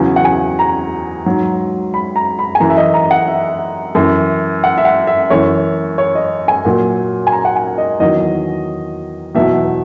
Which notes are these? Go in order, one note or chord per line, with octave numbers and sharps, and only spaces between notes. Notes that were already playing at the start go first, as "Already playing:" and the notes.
Already playing: E2 C#3 F#3 G#5
F#5
G#5
A#5
G#2 F#3
B5
A#5
B5
G#5
F#2 E3 A#5
E5
D#5
A#5
F#5
E5
F#2 E3
F#5
E5
F#5
E5
F#2 E3 C#5
C#5
D#5
G#5
A#2 F#3
G#5
A#5
F#5
G#5
D#5
E2 D#3 F#3 D#5
E2 B2 F#3 E5